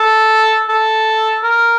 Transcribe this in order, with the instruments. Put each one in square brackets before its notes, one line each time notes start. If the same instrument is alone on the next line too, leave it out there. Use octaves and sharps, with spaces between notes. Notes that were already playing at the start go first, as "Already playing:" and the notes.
Already playing: [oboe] A4
A4
A#4